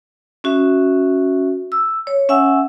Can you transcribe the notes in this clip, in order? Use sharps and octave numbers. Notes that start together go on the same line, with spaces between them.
C#4 F#4 E5
E6
C#5
C#4 E5 F#5 G#5 E6